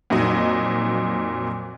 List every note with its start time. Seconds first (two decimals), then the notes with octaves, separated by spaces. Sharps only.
0.10 F2 A#2 F#3 D#4 D#5